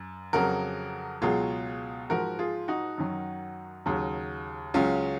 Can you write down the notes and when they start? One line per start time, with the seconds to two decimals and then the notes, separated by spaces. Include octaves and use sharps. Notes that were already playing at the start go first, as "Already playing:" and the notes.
Already playing: F#2
0.33 F2 C#3 F#3 F#4 A#4
1.22 C#2 B2 F#3 F4 G#4
2.09 G#2 F3 F#4 A#4
2.39 F4 G#4
2.68 D#4 F#4
2.98 F#2 D#3 F#3
3.86 D#2 C#3 F#3
4.74 C#2 C#3 F#3 C#4 F4